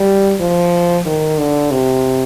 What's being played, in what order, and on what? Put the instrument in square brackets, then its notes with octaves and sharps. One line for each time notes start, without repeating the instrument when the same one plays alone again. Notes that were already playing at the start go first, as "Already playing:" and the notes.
Already playing: [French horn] G3
F3
D#3
D3
C3